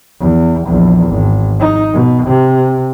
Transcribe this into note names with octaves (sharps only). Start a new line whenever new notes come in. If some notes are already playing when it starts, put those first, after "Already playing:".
E2
A#1 E2
G#1
D#4
B2
C3